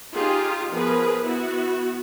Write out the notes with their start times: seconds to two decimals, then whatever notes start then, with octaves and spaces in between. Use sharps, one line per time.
0.14 D#4 F4 G4 G#4
0.71 F3 B3 G#4 A#4 B4
1.22 B3 E4 F#4